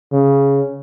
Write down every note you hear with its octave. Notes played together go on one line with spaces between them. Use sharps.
C#3